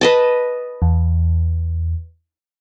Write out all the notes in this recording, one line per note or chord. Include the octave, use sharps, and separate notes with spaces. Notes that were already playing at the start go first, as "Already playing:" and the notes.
B4 D#5 A5
E2